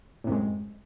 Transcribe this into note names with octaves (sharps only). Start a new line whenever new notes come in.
F#2 A2 C3 G#3